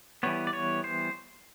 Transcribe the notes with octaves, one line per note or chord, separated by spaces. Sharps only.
E3 G3 B3 C#5
D5
C#5
C5